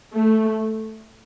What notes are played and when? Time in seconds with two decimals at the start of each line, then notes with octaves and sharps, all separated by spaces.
0.13 A3